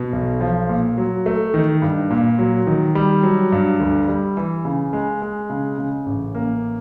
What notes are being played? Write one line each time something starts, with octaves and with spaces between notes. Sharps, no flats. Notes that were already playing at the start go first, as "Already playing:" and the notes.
Already playing: B2
B1
F3
A#2
F#3
A3
D#3
G2
A#2
F#3
D#3
G3
F#3
G2
D2
G3
E3
C#3
G#3
G#3
C#3
C#3
A1
A#3